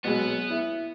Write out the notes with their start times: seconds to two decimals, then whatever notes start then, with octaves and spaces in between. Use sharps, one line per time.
0.05 B2 F#3 G#3 B3
0.50 E4